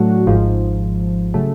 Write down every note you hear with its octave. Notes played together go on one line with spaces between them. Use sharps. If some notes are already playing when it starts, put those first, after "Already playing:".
Already playing: A2 F#3 A3 D4 F#4
G#1 G#2 F3
C#3 F#3 A3